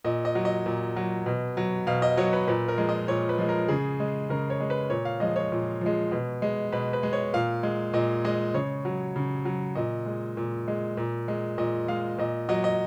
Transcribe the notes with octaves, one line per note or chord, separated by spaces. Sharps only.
A#2 D#5
D#5
F#3
D#5
A#2
F#3
B2
F#3
B2 F5
D#5
F#3 C#5
B4
A#2 B4
A#4
F3 G#3
D#5
A#2 C#5
B4
F3 G#3
A#4
C#3 G#4
G#3
C#3 A#4
C#5
G#3
B4
A#2 C#5
F5
F3 G#3 D#5
C#5
A#2
F3 G#3
B2
G#3
B2 B4
B4
G#3
C#5
A#2 F5
G#3
A#2 D#5
G#3 D#5
C#3 C#5
F#3
C#3
F#3
A#2 D#5
G#3
A#2
G#3
A#2
G#3
A#2 D#5
G#3 F5
A#2 D#5
F#3 D#5
D#5